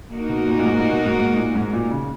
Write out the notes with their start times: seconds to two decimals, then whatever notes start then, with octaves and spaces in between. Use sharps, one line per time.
0.11 A#3 D#4 F#4 A#4
0.29 B2
0.48 A#2
0.59 A#2
0.65 G#2
0.80 A#2
0.92 B2
1.06 G#2
1.19 G#2
1.37 A#2
1.55 G#2
1.73 A#2
1.91 C#3